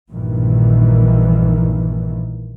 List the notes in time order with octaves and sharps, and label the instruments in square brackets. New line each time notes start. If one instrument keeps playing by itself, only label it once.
[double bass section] A#1 G2 A#2 D#3 E3